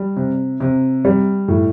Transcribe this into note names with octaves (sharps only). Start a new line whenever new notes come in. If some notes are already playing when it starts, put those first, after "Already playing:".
Already playing: G3
C3
C3
G3
A2